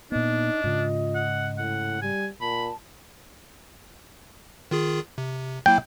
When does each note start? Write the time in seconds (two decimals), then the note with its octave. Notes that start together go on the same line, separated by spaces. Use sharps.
0.12 A#2 B3 D4 D#4 D#5
0.64 G#2 C#3 F4
1.15 F#5
1.58 A2 F#5
2.02 G3 G#5
2.41 A#2 A5 B5
4.71 D#3 F4 G#4
5.18 C3
5.66 F#3 A#3 E4 G5